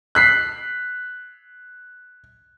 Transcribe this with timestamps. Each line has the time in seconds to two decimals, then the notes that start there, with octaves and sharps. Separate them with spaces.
0.15 F#6 B6 C7